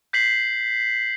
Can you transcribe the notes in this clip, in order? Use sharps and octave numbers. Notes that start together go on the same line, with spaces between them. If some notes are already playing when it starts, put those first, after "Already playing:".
G6 B6 C7 F#7